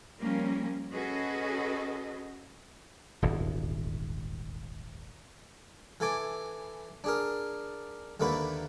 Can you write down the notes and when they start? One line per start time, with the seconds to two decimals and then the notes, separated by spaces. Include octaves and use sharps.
0.18 F3 G3 A#3 C#4 A#4
0.92 C#4 F#4 G#4 A4 B4 D#5
3.22 D#1 G#1 E2
6.00 E3 A4 G#5 D6
7.04 D4 G#4 A#4
8.20 D#2 D3 A3 A#3 B4 B5